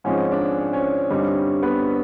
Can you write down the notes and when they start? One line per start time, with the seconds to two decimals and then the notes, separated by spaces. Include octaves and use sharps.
0.04 G#2 F3 G#3 C4 C#4 D#4 C#5
0.31 D4 D5
0.58 C#5
0.66 C5
0.73 C#4 C#5
1.10 G2 D3 G3 C4 D#4
1.63 B3 B4